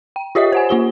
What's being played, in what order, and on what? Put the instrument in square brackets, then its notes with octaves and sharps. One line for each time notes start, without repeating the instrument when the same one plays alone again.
[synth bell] G5
F4 G4 C#5 D#5 E5 D#6
C5 F#5 G#5
A#3 F4 G4 G7